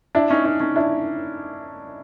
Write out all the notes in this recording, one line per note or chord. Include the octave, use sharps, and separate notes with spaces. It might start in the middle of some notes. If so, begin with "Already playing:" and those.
D4 E4
C#4 D#4
C#4 D#4
C#4 D#4
D4 E4